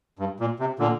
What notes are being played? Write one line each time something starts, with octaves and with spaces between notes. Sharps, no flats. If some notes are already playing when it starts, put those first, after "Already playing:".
G2
A#2
C3
A#2 D3